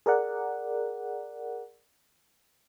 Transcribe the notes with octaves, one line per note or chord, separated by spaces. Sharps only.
G#4 A#4 D5 F#5